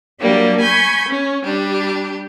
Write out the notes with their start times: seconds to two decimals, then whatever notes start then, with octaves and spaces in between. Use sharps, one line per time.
0.20 F#3 G3 A#3 D4 G4
0.61 G#5 B5 C#6 G6 G#6
1.09 C#4
1.44 G3 D4 G4